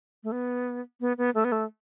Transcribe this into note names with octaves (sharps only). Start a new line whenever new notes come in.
A3
B3
B3
B3
A3
B3
A3